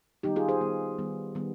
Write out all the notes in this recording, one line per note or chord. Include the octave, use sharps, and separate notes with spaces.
D#3 G3 B3 D#4 G4
F4 G#4
G#4 C5
D#3 G3 B3
D#3 G3 B3
D#3 G3 B3